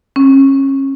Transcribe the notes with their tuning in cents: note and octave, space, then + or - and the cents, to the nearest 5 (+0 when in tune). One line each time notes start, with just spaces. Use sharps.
C#4 -30